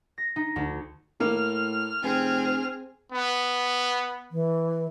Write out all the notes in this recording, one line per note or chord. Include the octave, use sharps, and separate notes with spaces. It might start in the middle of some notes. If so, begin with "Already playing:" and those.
A#6
D#4
D2
A2 A#3 F6
F1 C4 G#4
B3
E3